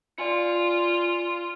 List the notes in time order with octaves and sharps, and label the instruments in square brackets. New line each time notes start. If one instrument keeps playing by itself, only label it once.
[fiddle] F4 [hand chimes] D5 G#5 C#7